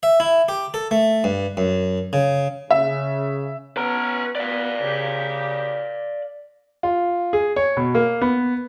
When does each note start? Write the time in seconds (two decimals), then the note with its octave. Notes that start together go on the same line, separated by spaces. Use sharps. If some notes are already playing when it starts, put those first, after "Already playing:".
0.03 E5
0.20 E4
0.49 G4
0.74 A4
0.91 A3
1.24 G2
1.57 F#2
2.13 C#3
2.71 C#3 E5
3.77 B3 C#4 B4 A#5
4.35 B3 B4 D5 F5
4.81 C#3 G4
6.83 F4
7.33 G#4
7.56 C#5
7.77 B2
7.95 A#3
8.21 B3